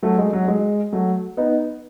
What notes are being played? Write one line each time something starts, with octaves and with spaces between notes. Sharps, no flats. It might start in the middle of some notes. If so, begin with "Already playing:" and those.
F#3 A3
G#3
F#3
G#3
F#3 A3
B3 D#4